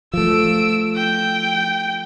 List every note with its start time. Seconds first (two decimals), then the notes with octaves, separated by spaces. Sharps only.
0.14 F3 A3 E6 D7
0.96 G5